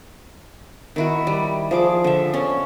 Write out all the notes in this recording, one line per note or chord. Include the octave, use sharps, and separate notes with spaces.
D#3 E4 F#4
G3
F3 G#4 D6
D3 E5
C#4